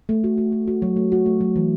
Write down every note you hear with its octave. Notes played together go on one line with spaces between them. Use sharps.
A3
F#4
F#4
F#4
F#4
F#3
A3
F#4
A3
F#3
E3